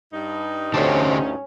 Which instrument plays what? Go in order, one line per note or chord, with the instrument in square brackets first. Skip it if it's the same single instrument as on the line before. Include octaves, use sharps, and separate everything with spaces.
[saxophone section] G2 D#4
[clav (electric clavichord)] D2 A5 [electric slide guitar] D3 G4 C5 [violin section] C#4